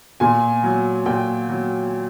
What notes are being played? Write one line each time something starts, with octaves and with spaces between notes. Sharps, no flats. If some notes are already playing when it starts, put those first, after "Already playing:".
A#2 G#5
F#3
A#2 G5
F#3